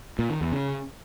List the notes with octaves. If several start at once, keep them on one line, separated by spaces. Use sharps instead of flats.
A#2
D#3
E2
C#3